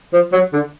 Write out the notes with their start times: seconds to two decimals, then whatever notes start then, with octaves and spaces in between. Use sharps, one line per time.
0.13 F3
0.32 F#3
0.53 D3